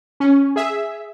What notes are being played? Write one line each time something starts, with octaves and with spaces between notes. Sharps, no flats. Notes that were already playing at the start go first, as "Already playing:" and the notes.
C#4
G#4 E5